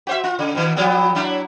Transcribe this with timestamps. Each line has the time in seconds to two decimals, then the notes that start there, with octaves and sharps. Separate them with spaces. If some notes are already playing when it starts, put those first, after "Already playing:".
0.07 F#4 C5 E5
0.24 F4
0.39 C#3
0.55 B2 D#3
0.76 F3 G3 B3
1.15 F#3 D4 E4